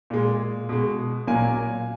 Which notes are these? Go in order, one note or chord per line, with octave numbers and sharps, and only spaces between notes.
A#2 G#3
B2 G#3
A#2 F#3 A#3 G#5